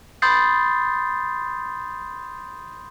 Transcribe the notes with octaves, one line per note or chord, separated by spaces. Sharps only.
B5 C6 D#6 G6 A6 C7